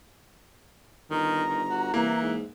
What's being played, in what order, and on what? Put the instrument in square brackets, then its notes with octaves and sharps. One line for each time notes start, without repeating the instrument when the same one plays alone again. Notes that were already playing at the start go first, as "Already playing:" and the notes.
[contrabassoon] G1 [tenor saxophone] D#3 [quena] A#5
[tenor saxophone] D#3
F#4
[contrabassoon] C2 [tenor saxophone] E3 [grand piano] A#3
[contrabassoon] G#2